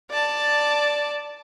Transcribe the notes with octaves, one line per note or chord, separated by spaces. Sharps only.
D5 A5